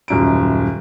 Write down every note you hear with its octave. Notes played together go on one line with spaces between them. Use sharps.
D#1 F#2 D7